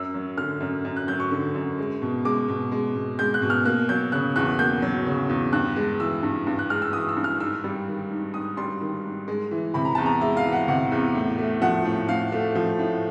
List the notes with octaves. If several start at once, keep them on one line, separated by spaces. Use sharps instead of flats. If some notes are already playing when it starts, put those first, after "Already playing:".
Already playing: F#2 E6
F#3
D3 F6
F#2
F#2
F#6
F#3 G6
C#6
D3
F#2
G#3
B2
G#3 D6
B2
G#3
B2
G#3 G6
F#6
B2
F6
A#3 F#6
F#3 G6
C#3 F#6
E2 F#6
A#3 G6
F#3
C#3
E2
G2 F#6
G#3
E3 E6
G2
G2
F#6
G#3 F6
E6
E3 D#6
E6
G2
F6
G#2 E6
G3
D#3
G#2
G#2 D#6
G3 C6
D#3
G#2
G#3
E3
C3 B5
A#5
E2 A5
A#5
G#3 E5
F5
E3
F#5
C3 F#5
E2
A2
A3
F3 F#5
A2
A2 F5
A3
F3
A2